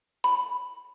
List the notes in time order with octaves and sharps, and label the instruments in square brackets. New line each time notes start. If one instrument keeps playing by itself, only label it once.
[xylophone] B5